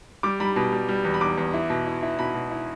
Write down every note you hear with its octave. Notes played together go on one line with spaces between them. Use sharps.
G3 D6
G3 B5
B2
G3
G3
E2
B5
E2 D6
E2
E4
B2
E4
E4
B2 B5
B2
E4